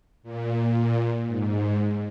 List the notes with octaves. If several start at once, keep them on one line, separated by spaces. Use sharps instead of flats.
A#2
G#2